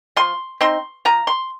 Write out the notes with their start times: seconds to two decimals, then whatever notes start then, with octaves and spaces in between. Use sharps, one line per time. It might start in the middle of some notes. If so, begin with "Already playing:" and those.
0.16 F3 C6
0.61 C4 D#4 C6
1.05 F3 A#5
1.27 C6